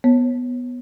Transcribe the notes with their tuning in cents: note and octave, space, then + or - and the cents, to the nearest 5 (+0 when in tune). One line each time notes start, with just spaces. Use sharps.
B3 +0 C#5 -30